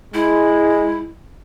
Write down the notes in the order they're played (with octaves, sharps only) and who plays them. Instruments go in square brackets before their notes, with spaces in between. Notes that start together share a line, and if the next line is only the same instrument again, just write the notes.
[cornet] G#3 [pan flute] E4